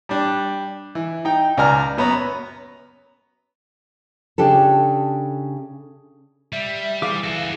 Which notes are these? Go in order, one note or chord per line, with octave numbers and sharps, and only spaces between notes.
G3 D4
E3
D#4 G5
C#2 D5 G#5 A#5 F6
F#2 B3 C#4 A#5
C#3 D4 G4 A4
G3 E5
E3 G#4 F5 D6
F#4 A4